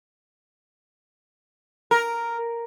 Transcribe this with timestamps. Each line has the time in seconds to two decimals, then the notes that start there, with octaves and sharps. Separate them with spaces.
1.91 A#4